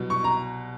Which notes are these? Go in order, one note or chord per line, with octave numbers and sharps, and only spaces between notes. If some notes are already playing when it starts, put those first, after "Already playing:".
Already playing: C2 B2 F#3
C#6
A#5